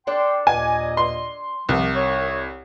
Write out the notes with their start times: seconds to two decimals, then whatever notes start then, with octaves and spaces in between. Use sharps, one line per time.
0.07 D4 A4 D5 G5 C6
0.47 D#2 A#2 D#5 G#5
0.97 C6
1.69 C2 D#3 F3
1.95 C#5